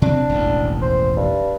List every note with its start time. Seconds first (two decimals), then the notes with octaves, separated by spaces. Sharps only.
0.02 C3 C4 D4
0.29 E1 A1 D#2
0.82 C5
1.17 G2